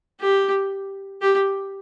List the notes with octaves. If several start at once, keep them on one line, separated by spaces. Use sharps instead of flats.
G4
G4